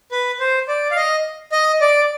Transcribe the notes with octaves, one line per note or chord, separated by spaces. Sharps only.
B4
C5
D5
F5
D#5
D#5
D5